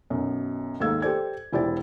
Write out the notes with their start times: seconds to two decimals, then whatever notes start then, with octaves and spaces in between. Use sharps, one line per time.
0.10 B1 F#2 B2
0.80 D#2 G#2 A4 F5 E6 G#6
1.02 G4 A4 C5 D5 G#6
1.52 E1 E4 G4 C5 D5 A6